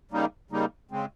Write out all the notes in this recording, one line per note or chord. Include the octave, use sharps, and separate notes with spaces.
C#3 G3 A#3 D#4
C#3 G3 A#3 D#4
C#3 G#3 C4